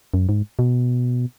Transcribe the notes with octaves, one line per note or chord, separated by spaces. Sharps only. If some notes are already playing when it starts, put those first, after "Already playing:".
F#2
G#2
B2